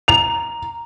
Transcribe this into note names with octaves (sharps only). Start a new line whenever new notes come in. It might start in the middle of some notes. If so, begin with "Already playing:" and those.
A#5 F7